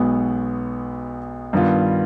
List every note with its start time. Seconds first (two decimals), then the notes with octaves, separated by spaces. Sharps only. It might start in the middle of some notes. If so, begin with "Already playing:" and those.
Already playing: B1 B2 G#3 B3
1.53 G2 D#3 B3 F4